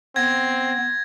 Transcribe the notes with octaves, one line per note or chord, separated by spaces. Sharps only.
B3 C4 G#6 A#6